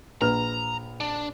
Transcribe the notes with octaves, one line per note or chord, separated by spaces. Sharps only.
A#1 B4 A#5 F6
D4